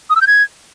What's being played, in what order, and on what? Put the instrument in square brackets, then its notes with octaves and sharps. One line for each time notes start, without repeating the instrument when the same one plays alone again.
[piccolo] D#6
E6
G6
G#6